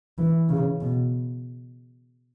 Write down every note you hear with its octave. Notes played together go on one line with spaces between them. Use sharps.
E3
C#3
B2